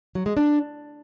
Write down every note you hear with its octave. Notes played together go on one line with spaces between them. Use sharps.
F#3
G#3
D4